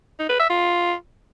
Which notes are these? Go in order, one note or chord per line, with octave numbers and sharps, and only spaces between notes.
D#4
B4
E5
F4